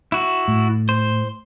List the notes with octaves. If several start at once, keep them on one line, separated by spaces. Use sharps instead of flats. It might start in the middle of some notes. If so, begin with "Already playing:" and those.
E4 F#4
A2
C5